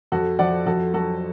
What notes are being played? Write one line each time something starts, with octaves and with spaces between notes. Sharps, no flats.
F2 F#4 A4
F3 D5 F#5
F2 F#4 A4
F#3 F#4 A4